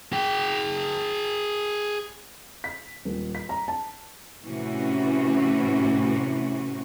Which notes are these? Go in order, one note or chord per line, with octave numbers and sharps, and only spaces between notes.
G#4 G5
B6
D#1
B6
A#5
A5
A2 C3 E3 C#4 F#4